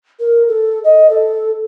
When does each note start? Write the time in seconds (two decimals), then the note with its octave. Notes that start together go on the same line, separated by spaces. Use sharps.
0.20 A#4
0.48 A4
0.84 D#5
1.10 A4